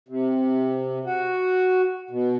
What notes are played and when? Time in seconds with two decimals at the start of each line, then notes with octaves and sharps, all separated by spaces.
0.09 C3
1.05 F#4
2.10 B2